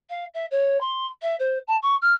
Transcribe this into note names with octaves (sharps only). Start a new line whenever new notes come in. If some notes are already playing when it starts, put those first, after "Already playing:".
F5
E5
C#5
C6
E5
C5
A5
C#6
F6